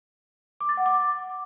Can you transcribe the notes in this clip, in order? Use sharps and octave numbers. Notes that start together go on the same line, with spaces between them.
D6
A6
F#5
D6